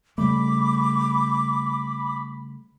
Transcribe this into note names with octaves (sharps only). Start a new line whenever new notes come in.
C#3 G3 A3 B5 D6